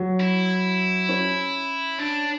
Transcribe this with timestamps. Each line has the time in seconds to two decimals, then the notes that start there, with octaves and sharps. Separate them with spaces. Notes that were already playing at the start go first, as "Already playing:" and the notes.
Already playing: F#3
0.20 E4
1.09 C#4
1.99 D4